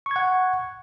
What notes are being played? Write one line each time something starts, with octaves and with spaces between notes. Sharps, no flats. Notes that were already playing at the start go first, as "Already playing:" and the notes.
F#5 C#6 G#6